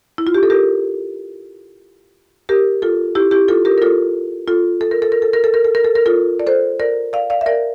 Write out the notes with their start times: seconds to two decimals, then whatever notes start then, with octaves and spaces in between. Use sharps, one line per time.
0.18 E4
0.27 F4
0.34 G4
0.43 A4
0.50 G4 A#4
2.49 G4 A#4
2.82 F4 A4
3.15 E4 G4
3.31 E4 G4
3.48 F4 A4
3.65 G4 A#4
3.78 A#4
3.82 F4 A4
4.48 F4 A4
4.81 A4
4.91 A#4
5.02 A4
5.12 A#4
5.22 A4
5.33 A#4
5.44 A4
5.54 A#4
5.65 A4
5.75 A#4
5.84 A4
5.95 A#4
6.06 F4 A4
6.40 D5
6.47 A4 C5
6.80 A#4 D5
7.13 D5 F5
7.30 D5 F5
7.41 E5
7.46 A#4 D5